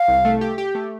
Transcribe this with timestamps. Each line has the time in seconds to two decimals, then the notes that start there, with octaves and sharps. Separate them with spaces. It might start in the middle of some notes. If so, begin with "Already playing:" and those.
Already playing: F5
0.08 C2
0.25 A3
0.41 G4
0.58 G4
0.75 A3